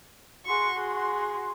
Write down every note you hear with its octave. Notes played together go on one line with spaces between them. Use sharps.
F#4 G#4 C6 C#6
G#4